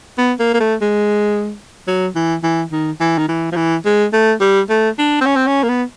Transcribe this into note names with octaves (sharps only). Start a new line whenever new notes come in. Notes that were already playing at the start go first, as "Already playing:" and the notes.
B3
A#3
A#3
A3
G#3
F#3
E3
E3
D#3
E3
D#3
E3
F3
E3
G#3
A3
G3
A3
D4
C4
C#4
C4
C#4
A#3
B3